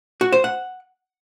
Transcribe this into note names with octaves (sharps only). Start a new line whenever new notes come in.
F#4
C5
F#5